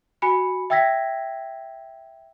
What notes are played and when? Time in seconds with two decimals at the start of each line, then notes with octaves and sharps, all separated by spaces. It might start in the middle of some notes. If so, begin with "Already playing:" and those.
0.22 F#4 G#5 B5 C#7
0.70 E5 G5 E6 G#6 A#6 B6